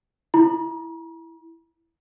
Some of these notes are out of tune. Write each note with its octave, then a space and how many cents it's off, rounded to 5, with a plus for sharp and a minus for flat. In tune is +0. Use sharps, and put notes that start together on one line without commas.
E4 +0 A#5 +45